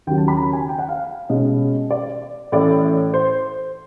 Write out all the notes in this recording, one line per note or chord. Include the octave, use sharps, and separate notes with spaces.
D#2 C#3 F#3 G5
A5
B5
A#5
G#5
G5
F#5
F5
B2 G#3 C#4 D#5
D5
A2 E3 A3 C#4 D5
C5